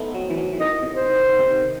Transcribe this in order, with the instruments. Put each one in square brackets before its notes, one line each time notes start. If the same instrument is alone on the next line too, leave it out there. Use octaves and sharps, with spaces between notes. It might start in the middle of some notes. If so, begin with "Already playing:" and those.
Already playing: [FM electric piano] A3 B3 C4 D#4 E4
F#3
E3
F#3
E3
[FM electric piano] D#3 [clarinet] D#5
[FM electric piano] C3
[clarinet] C5
[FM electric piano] D#3
D#3
C3
D#3